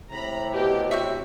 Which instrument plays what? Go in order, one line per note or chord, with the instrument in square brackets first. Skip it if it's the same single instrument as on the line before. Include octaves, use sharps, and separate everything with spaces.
[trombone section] A2 C3 [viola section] A#5 B5
[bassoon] B2 [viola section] G4
[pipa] C4 C#5 E5 [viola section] F#4